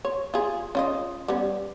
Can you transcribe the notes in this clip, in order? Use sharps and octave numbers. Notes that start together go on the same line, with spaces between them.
C#5
F4 G#4
C#4 F4 D#5
G3 B3 C#4